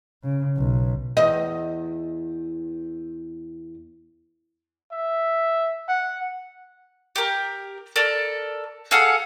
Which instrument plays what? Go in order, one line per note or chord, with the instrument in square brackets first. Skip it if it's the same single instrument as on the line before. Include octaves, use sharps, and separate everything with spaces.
[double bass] C#3
B1
[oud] E2 D#5
[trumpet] E5
F#5
[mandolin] G4 A#4
A4 A#4 D5
G#4 A4 F5 F#5